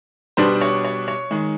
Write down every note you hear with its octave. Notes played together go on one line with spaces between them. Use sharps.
B2 G3 B3 D4 C5
C#5
C#5
C#5
D#3 G#3